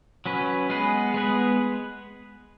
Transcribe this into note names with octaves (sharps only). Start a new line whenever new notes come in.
F#3 C#4 B4
G#3 B3 G#4 B4
G#3 B3 G#4 B4